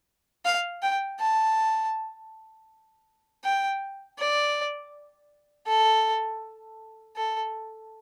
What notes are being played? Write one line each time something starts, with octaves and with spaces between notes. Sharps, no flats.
F5
G5
A5
G5
D5
A4
A4